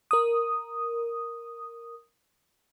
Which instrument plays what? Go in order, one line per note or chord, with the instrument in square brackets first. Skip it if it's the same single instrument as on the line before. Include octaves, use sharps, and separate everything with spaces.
[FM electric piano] A#4 D#6